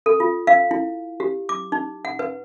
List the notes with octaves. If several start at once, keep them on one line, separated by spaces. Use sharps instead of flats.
A4
F4
F5
E4
G4
D6
D#4
F#5
B4